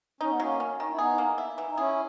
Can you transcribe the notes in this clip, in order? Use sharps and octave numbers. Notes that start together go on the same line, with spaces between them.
C#4 D#4
B3
F#3 A#3 C#4
C#4
D#3
E4
B3 D#4 G#4
A#3
E4
E3
D#4
C#4 E4 G#4